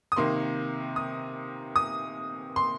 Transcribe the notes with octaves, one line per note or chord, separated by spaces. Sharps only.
D#6
C3 D#3 A#3 C6
D#6
D#6
C6